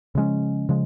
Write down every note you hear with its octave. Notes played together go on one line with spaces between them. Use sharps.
C#3 F3 G#3 C#4
C#3 F3 G#3